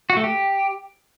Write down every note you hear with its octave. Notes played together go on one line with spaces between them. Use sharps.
F#4
A3
G4